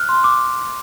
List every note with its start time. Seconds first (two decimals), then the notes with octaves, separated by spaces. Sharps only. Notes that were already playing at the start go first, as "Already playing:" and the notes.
Already playing: F6 F#6
0.09 C6
0.24 D6